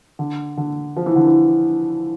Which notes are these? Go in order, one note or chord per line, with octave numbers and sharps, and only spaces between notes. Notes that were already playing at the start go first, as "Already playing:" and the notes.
D3
D3
F3
E3
D3
E3